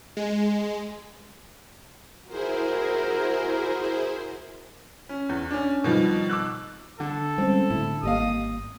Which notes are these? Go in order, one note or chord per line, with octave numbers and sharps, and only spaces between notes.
G#3
E4 F#4 G#4 A#4 C5
C#4
E2
C#4 D4
B2 D#3 F3 G3
D6 E6 F#6
D3 A4
G3 G#3 C4 C#4
A2 D3 E4
G#1 G3 A#3 D#5 F5 D#6